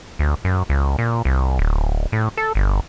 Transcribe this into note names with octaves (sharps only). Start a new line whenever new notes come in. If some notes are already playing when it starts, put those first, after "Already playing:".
D2
F#2
C#2
A#2
C2
D1
A2
A4
G1